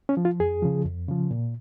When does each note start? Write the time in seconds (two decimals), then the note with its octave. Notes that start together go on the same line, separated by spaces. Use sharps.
0.09 C#4
0.17 F3
0.25 F4
0.40 F2 G#4
0.62 C#3 F3
0.85 F2
1.08 C#3 F3
1.31 A#2